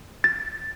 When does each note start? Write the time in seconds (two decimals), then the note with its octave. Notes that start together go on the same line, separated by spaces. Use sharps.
0.24 A6